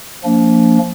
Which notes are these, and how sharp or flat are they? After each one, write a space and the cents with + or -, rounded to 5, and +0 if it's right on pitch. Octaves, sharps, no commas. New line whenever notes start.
F3 +5 A#3 -15 D4 -35